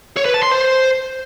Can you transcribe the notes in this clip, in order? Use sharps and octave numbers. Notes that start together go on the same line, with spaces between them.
C#5
B4
A5
C6
C5